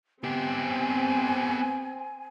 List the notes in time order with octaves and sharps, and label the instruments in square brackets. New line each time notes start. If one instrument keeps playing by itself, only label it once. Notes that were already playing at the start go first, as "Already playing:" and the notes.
[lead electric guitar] B3 G4 [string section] C4 [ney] G#5